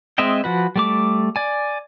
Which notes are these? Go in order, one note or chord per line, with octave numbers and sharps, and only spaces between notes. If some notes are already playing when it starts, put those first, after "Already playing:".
G#3 C4 D#5 E5 G5
F3 F#4 B4
G3 A3 D6
D5 G#5